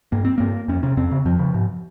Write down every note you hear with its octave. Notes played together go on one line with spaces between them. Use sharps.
G2 A#3
C4
G2 A#3
F2 C#4
C3 C#4
F2 C4
C#3
F2 F3
C#3
G#2